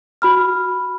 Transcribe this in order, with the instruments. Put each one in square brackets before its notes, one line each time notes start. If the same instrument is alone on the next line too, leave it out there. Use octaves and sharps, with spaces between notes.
[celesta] F#4 B5 F6